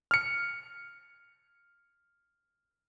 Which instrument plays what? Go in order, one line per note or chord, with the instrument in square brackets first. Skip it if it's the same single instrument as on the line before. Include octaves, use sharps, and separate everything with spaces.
[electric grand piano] F6 C#7